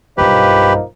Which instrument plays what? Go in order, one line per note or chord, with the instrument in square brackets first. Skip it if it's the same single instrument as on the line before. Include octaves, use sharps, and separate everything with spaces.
[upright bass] B1 G2 [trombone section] F3 A#3 D#4 [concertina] G4 B4